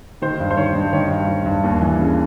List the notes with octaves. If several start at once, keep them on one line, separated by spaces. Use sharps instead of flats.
D#3 C5
G2
C5
D#3 C#5
G2
D#3 C#5
G2
D#3
G2
D#2
E3
C#3